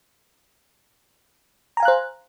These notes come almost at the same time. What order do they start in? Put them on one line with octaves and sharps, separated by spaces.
A#5 G#5 F5 F#6 C5